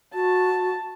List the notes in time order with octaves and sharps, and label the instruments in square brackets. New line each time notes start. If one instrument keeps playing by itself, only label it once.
[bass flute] F#4 [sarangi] A5